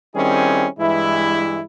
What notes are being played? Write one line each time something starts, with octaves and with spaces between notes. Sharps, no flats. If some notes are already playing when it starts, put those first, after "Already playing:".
D#3 G3 C4 C#4 E4 G#4
G2 E3 G#3 E4